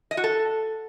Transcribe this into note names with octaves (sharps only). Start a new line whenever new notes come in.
D#5
F#4
A4